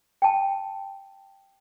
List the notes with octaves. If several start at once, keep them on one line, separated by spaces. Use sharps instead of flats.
G5 A5